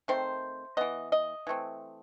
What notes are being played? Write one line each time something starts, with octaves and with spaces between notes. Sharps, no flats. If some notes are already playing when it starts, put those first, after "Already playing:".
D#3 A3 C4 C5
E3 B3 D#5
D#5
E3 A3 C4